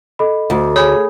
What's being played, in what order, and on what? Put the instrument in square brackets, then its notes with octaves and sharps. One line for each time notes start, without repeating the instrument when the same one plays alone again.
[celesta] A4 D#5 B5
[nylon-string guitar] D2
[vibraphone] G#4 [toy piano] C#5 [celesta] G#5 B5 D#6